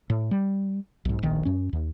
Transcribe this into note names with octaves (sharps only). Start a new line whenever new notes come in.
A2
G3
B1 G#2
D1 A#1 D#3
F#2 C#4
D#2